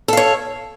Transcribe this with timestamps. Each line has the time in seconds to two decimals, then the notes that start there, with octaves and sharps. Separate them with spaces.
0.08 A4
0.13 F5
0.17 C#5